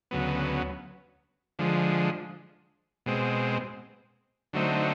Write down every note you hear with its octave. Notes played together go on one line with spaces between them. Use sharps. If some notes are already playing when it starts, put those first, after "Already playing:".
D2 C#3 F#3 B3
D3 F3 G#3
B2 G#3 C4
D3 F#3 A3 C4 D#4